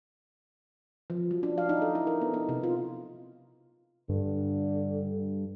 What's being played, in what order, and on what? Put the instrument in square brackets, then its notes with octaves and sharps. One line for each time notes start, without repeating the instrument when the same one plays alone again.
[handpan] F3
F#3
D4
F5
D#4
A4
E4
A#4
B3
D#4
C3
F4
[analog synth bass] G2 [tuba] D3